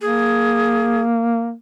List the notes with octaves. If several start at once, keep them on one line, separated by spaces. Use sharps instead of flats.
A#3 G#4